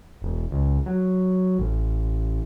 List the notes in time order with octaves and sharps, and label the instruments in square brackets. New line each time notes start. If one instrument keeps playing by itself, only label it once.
[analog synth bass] E1
C#2
F#3
A1